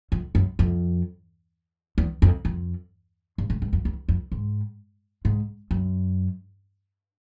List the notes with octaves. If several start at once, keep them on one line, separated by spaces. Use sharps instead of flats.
F2
F#2
F2
E2
F2
F2
G2
G#2
G2
F2
E2
F2
G#2
G#2
F#2